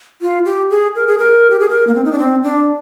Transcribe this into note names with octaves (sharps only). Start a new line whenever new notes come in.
F4
G4
G#4
A#4
G#4
A#4
G4
G#4
A#4
A#3
C4
D#4
D4
C4
D4